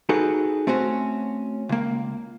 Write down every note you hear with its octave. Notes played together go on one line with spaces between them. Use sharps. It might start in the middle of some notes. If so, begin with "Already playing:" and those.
D#4 F#4 G#4 A4 B4
A3 C4 C#4 F#4
C#2 A#3